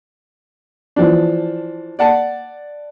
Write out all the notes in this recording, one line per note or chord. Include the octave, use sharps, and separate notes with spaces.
E3 F3 D4
D5 F#5 A5